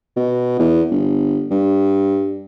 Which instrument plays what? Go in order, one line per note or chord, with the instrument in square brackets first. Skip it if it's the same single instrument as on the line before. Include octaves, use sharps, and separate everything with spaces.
[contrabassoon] B2
E2
G1
G2